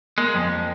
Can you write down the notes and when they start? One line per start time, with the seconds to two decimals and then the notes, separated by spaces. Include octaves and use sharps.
0.18 G#3 A#3
0.34 F2